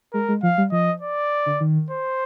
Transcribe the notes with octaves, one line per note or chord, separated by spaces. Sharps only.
G#3 A#4
G#3
F3 F5
G3
F3 D#5
D5
D3
D#3
C5